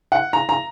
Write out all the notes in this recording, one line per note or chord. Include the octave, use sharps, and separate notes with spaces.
F#5
A#5
A#5